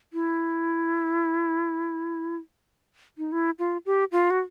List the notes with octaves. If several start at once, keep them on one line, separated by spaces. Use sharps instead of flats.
E4
D#4
E4
F4
G4
F4
F#4